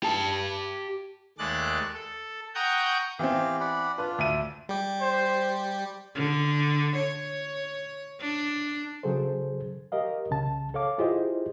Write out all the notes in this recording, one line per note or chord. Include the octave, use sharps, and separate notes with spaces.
G4 A5
D#2 G#3 A3 D5 F#6 A6
A4
F#5 G5 A#5 C#6 D#6 G6
E3 B3 C4 G4 F5
D5 F#5 B5
D4 F4 B4
D2 E5 D#7
G3 G4
C5
D3
C#5
D4
C#3 F#3 G#4 A4 C5
G4 A#4 D#5 F5
C2 C#3 A5
A4 C#5 F5 D6
E4 F4 G4 G#4 C5 D#5